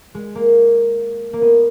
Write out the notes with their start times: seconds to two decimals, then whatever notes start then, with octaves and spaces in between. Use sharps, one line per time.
0.15 G#3
0.35 A#3
1.33 A#3
1.42 B3